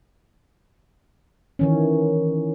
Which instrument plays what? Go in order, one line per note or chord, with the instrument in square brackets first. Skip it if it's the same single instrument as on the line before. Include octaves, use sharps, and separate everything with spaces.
[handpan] D#3 E3 C#4